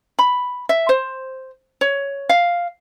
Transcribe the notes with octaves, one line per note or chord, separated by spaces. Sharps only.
B5
E5
C5
C#5
F5